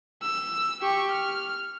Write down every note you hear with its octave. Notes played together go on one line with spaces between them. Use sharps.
E6
G4 C#6
F6